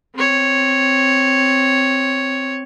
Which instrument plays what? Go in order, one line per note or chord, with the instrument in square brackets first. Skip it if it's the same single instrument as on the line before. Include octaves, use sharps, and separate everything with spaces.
[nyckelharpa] C4 C#5